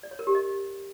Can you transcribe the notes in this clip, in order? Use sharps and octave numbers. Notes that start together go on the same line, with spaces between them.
D5
C#5
A#4
G4
D#5